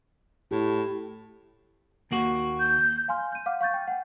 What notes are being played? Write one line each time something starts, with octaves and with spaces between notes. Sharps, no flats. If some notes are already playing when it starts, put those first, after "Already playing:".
A2 G4
D#2 A#3 F#4
G6
F5 G#5 C6 F6
G6 D#7
F5 F#5 D6 F6
F5 C#6 G6 A6
G5
F#5 G5